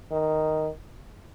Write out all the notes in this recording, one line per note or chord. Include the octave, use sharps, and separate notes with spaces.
D#3